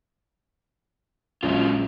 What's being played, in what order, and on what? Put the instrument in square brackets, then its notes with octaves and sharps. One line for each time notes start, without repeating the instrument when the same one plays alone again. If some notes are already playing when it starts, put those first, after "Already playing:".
[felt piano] A#1 C#3 [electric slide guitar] F#3 G#3 F4